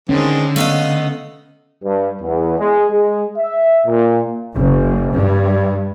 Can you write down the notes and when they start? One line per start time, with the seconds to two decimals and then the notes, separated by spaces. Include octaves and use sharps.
0.09 D3 D#3 G#3 C4 C#4
0.56 A3 B3 D#5 F5
1.83 G2
2.21 E2
2.58 G#3
2.90 G#3
3.37 E5
3.86 A#2
4.54 F#1
5.15 G2